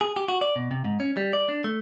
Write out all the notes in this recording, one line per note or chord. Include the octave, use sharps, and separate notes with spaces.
G#4
G4
F#4
D5
B2
C3
G#2
C#4
G3
D5
D4
A3